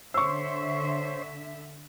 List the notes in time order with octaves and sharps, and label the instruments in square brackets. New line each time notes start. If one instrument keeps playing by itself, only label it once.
[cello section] D3 E5 [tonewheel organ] C5 C#5 C6 [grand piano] C#6 E6